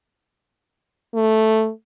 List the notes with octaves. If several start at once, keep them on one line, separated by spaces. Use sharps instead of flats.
A3